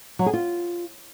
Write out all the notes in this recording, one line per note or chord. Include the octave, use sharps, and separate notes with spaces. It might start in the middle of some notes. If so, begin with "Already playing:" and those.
F#3
G#4
F4